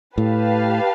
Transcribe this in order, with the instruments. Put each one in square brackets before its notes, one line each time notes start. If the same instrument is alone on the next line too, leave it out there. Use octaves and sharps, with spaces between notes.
[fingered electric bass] A2 [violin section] G4 B4 F5 A5